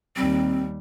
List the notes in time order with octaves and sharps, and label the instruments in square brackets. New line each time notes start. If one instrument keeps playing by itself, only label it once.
[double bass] D#2 G3 [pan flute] C4